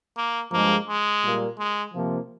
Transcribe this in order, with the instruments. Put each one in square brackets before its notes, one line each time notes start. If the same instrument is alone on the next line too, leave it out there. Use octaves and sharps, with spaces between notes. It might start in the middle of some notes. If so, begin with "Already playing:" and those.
[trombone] A#3
[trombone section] G2 F3 G#3 [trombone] A#3
[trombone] G#3
[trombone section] A#2 G3 A#3
[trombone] G#3
[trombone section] C3 F3 A#3 F4